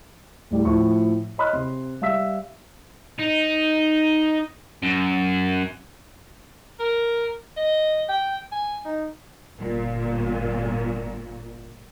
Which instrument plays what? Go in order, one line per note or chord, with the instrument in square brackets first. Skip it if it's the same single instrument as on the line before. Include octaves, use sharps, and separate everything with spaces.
[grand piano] A2 G3 A3
A2 F3 C#6
C#5 D#5 B5 D#6 F6 F#6
C3 C6
G3 E5 F5 E6 B6
[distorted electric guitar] D#4
F#2
[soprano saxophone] A#4
D#5
G5
G#5
D#4
[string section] G1 A#2